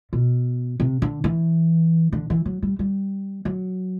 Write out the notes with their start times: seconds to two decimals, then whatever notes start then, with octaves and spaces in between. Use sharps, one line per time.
0.13 B2
0.80 C3
1.02 D3
1.24 E3
2.13 D3
2.30 E3
2.45 F#3
2.62 G3
2.79 G3
3.45 F#3